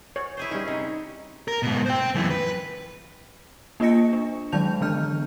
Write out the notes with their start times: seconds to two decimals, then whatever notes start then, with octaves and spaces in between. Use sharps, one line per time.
0.16 C#5
0.37 E4 G#4 C5
0.51 G3 C#4 D#4
0.68 C3 D#4
1.48 A#4
1.63 G#2 B2
1.86 C5 G5
2.15 F#2 E3
2.30 B4
3.80 A#3 D4 F4 D#5 A#6 C#7
4.13 D4
4.52 D#3 F#3 G#3 A5 G6 F7
4.81 D3 E3 B3 D4 F6 G6